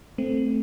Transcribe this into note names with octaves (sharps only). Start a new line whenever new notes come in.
A3 C4